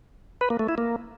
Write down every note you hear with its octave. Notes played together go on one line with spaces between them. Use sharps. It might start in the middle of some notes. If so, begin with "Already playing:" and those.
B4
A#3
A3
E4
A#3